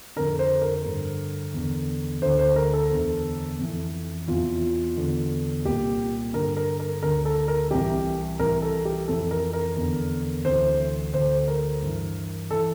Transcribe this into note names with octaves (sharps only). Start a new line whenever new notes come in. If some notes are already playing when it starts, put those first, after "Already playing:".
F2 D3 A#4
C5
A#4
G2 D3
E2 D3
D2 D3 C5
C5
A#4
A4
E2 D3
F2 E3
E2 C3 E3 F4
E2 D3
C2 A#2 G4
G2 D3 A#4
A#4
A#4
D2 D3 A#4
A4
A#4
C2 C3 E3 G4
C2 C3 E3 A#4
A4
G4
F2 C3 E3 A4
A#4
A#4
E2 D3
D2 C3 E3 C5
D2 D3 C5
A#4
G2 E3
E3 A4